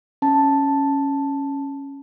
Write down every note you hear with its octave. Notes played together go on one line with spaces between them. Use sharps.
C#4 A5